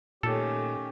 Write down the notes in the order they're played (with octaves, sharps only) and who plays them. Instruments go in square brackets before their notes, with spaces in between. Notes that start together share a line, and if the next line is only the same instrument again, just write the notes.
[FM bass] A#2 [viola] D#3 A3 [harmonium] C#4 G4 [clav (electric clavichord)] A4